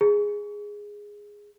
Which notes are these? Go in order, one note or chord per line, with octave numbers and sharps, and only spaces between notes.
G#4